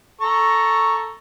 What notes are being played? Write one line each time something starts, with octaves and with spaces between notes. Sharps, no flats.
A4 A#5 C#6